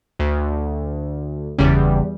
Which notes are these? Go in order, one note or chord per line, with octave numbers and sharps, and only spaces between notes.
D2
F#1 E2 C#3 G3